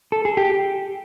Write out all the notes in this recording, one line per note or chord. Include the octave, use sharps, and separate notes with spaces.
A4
G#4
G4